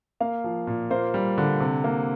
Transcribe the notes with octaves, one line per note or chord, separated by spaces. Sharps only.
A#3 F5
F3
A#2
A#3 C5
G3
D3
C3
A#3